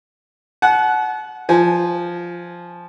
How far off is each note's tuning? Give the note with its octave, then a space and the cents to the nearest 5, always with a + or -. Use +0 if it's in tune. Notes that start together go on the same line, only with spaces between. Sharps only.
F#5 +0 A5 -40
F3 +0 G#5 +0